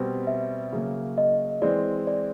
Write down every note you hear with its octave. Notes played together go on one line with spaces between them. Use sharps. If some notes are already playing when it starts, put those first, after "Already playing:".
Already playing: B2 G3 C4
E5
C#3 F#3 A#3
D#5
E3 G#3 C4 D5
D5